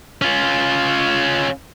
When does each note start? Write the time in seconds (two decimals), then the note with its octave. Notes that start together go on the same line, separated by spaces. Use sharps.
0.22 C#4 F4